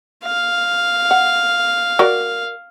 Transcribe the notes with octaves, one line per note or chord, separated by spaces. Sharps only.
F5
F#5
F#4 A#4 D5